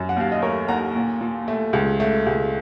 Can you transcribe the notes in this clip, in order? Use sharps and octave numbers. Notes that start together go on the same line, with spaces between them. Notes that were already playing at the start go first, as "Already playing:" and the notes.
Already playing: F#2
F#5
D#2 F5
D#5
A3 A#4 C#5
D#2 F#5 A#5
A#2
A#2
A3
C#2
A3
C#2